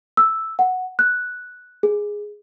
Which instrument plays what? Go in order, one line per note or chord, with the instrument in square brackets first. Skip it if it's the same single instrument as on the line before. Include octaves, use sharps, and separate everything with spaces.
[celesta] E6
F#5
F#6
G#4